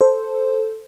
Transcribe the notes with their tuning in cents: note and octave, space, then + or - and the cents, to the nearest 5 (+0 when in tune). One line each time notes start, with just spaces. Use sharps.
A4 +0 C5 +0